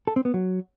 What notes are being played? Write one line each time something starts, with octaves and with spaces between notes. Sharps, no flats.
A4
C4
B3
F#3